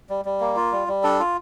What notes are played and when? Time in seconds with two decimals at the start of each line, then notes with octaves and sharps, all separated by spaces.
0.10 G3
0.25 G3
0.40 A#3
0.56 F4
0.72 G3
0.88 G3
1.03 D4 A4
1.20 F4